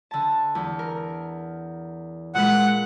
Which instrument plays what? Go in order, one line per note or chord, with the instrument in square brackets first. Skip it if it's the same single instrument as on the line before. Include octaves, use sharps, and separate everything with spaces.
[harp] D3 A5
E2
A#4
[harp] A#2 G#3 B4 [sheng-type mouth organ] F#5